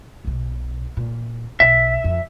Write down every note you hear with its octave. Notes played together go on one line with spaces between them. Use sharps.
B1 B2
A#2
B1 E5
F2